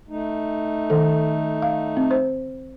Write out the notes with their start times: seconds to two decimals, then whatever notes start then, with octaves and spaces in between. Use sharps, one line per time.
0.09 A3 D#4
0.90 D#3 A4
1.62 F5
1.97 C4
2.11 C5